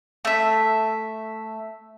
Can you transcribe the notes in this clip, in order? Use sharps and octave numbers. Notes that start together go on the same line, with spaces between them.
A3 E5